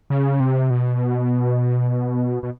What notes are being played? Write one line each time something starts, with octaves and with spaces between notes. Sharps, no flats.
C#3
C3
B2
B2